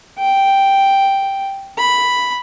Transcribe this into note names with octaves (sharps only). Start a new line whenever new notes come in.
G5
B5